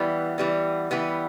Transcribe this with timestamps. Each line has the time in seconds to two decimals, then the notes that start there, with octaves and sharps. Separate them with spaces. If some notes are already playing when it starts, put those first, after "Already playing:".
Already playing: E3 G3 B3
0.38 E3 G3 B3
0.91 E3 G3 B3